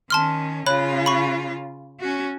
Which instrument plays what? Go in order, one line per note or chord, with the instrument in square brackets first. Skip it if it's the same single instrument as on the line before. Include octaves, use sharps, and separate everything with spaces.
[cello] D#3 C#4 [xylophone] A5 C6 F6
[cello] C#3 F4 [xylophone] C#5 B5 F#6
[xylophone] B5 C#6
[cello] C#4 F#4